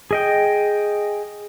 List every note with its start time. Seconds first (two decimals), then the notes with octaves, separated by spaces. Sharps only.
0.11 G#4 D#5 G5